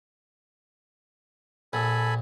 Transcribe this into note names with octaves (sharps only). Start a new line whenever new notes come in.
A#1 A4 G#5 B5